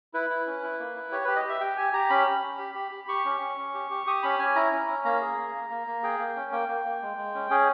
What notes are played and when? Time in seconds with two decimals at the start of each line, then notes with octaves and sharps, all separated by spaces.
0.14 E4 B4
0.30 E4
0.46 C#4
0.63 E4
0.80 A#3
0.96 E4
1.12 G4 C#5
1.25 G4 B4
1.36 D#5
1.45 G4 E5
1.61 G4 G5
1.77 G4 G#5
1.93 G4 A#5
2.10 C#4 B5
2.27 G4
2.43 C#4
2.59 G4
2.75 G4
2.91 G4
3.08 G4 C#6
3.25 C#4
3.41 C#4
3.58 C#4
3.75 G4
3.90 G4
4.07 G4 D#6
4.23 C#4 B5
4.39 C#4 G#5
4.56 E4 A#5
4.72 C#4
4.88 C#4
5.04 A#3 A#5
5.21 G#4
5.37 A#3
5.55 A#3
5.70 A#3
5.87 A#3
6.03 G#4 G5
6.19 A#3
6.36 C#4
6.52 A#3 G5
6.68 A#3
6.85 A#3
7.02 G#3
7.17 G#3
7.35 C#4
7.50 C#4 G#4